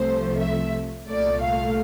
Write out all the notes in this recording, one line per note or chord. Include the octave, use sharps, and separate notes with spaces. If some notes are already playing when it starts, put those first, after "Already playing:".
Already playing: C2 C3 F3 A3 C5
E5
C2 A#2 A3 D5
F5